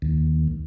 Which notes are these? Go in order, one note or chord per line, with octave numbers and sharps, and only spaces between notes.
D#2